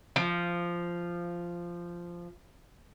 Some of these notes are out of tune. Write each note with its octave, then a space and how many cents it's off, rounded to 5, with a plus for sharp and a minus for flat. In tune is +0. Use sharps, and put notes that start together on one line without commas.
F3 -10